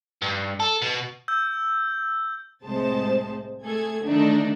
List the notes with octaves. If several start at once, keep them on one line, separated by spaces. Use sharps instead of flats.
G2
A4
B2
E6 G6
C2 A2 C3 G#3 C5 A5
A3 G#4 A4 G#6
D3 D#3 A3 D4 D#4